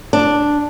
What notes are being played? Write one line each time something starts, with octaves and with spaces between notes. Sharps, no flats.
D4